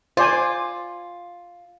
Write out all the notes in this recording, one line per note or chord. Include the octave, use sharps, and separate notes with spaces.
F4 C5 D5 G#5